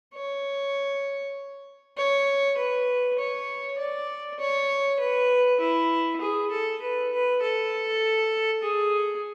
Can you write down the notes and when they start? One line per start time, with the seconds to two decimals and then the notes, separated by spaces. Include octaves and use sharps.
0.15 C#5
1.97 C#5
2.57 B4
3.19 C#5
3.78 D5
4.39 C#5
5.00 B4
5.60 E4
6.21 G#4
6.51 A4
6.82 B4
7.12 B4
7.42 A4
8.63 G#4